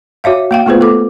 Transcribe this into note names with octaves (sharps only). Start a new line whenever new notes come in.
F#4 C#5 E5 F5
A#3 F5 G5
A3 B3 F4 G#4 B4 C5
A4 D6